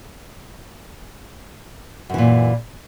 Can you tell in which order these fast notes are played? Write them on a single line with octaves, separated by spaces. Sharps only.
F#2 E3 A#2